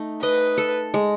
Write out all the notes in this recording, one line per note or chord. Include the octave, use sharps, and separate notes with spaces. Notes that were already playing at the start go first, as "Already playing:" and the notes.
Already playing: A3 D#4
B4 D#5
A4
G#3